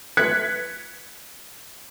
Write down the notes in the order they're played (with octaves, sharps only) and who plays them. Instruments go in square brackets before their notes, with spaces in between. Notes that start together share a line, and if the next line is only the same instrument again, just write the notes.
[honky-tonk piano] F#6 G#6 B6 C#7